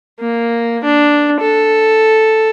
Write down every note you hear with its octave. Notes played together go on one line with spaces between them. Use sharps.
A#3
D4
A4